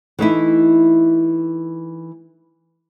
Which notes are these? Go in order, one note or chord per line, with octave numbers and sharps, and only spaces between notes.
E3 A3 D#4 E4